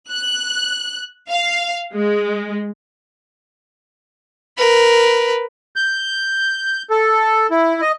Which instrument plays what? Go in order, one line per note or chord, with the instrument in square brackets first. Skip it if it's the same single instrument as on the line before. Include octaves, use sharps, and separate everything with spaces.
[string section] F#6
F5
G#3
[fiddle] A#4 B4
[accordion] G6
A4
E4
D#5